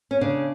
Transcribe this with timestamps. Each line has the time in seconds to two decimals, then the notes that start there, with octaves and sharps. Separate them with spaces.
0.11 C#4
0.21 C#3 D4